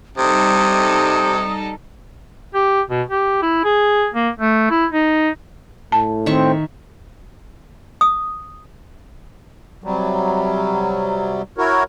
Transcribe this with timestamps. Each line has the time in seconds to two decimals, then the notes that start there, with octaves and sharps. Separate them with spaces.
0.18 C3 G3 D#4 A4 D#6
2.54 G4
2.90 B2
3.11 G4
3.42 E4
3.64 G#4
4.13 A#3
4.39 A3
4.70 E4
4.92 D#4
5.92 A2 A5
6.26 D#3 C4 E5 C#6
8.01 D#6
9.84 C3 F#3 G3
11.58 E4 F#4 A#4 C#5